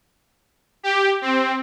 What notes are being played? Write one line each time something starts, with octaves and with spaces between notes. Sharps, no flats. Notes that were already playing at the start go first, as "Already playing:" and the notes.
G4
C4